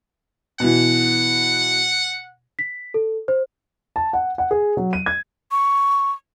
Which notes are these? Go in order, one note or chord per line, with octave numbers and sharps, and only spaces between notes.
B2 E3 F#5
B6
A4
C5
A5
F#5
F#5
G#4
F#3
D#7
G#6
C#6